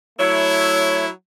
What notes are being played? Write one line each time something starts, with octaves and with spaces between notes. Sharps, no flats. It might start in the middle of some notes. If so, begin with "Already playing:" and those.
F#3 A3 E4 C#5